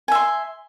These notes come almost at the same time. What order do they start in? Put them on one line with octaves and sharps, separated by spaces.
G#5 E5 C6